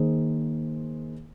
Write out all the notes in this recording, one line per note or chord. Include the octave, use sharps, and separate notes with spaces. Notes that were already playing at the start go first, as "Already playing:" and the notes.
Already playing: D#3 A#3 D#4 G#4 C5